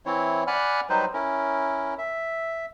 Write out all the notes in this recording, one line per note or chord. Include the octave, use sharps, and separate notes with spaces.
E3 C4 E4 C#5
D5 F#5 G#5 B5 F6 F#6
F#3 G3 D#4 B4 C5
C#4 E4 A#4
E5